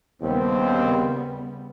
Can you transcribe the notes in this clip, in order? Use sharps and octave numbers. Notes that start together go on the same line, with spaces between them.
D#2 C#3 G3 B3 C4